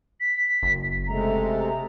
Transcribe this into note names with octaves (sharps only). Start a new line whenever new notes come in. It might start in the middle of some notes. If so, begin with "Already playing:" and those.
B6
F#1
C3 G#3 A3 A#5
A#5